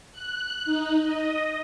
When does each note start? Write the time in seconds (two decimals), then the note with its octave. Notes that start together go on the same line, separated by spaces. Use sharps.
0.12 F#6
0.65 D#4
1.02 D#5